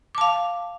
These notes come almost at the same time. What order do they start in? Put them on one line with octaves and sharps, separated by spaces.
D6 A5 F5